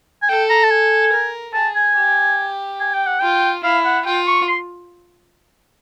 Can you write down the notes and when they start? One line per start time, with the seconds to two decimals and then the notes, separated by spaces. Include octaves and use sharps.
0.22 G#5
0.29 A4 G5
0.50 A#5
0.64 A5
0.71 G#5
1.12 A#4
1.54 G#4 A5
1.75 G#5
1.96 G4
2.80 G#5
2.93 G5
3.06 F#5
3.20 F4 G5
3.64 E4 F5
3.85 F#5
4.05 F4 G5
4.27 C#6
4.48 C6